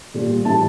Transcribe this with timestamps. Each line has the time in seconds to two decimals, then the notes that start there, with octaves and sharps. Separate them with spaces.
0.14 A#2 G3
0.45 A2 E3 G3 A5